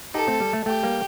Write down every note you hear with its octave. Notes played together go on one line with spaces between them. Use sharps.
D#4 G4 A4
A3 C4
G3
A3
A3 G4
G3 A#3